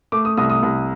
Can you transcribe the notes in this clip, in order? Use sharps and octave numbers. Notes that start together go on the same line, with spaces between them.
A3 D6
D#6
C2 D#6
D#6
C2